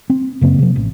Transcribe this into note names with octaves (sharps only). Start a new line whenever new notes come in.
C4
F#2 C#3 A#3 C4
C3 F3
A1